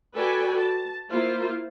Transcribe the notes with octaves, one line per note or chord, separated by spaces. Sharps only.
F#4 A4 B4 D5 G5 G#5
A5
A#3 E4 F4 C5